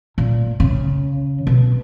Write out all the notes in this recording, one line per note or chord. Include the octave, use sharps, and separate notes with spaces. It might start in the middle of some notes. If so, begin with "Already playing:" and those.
A#2
C#3
B2